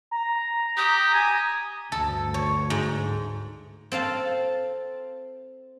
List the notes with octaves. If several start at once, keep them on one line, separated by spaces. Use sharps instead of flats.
A#5
G4 D#6
G#5
D2 G2 A4
C#5
G#2
C4 A4 F5 A5